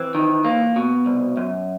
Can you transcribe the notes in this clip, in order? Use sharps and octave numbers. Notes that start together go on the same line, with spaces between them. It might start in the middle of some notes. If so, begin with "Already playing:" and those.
Already playing: E3 C4
D#3
A#3
B2
C2
F#2